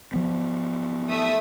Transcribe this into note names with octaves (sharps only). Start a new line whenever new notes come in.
F3 B3
A3 E5 D#6